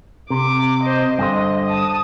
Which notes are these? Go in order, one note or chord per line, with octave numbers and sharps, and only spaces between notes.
C3 D6
C5 D#5
G2 D3 C5 D#5
A5 D#6